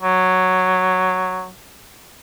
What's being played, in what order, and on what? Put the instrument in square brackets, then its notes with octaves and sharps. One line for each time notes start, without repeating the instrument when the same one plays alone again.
[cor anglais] F#3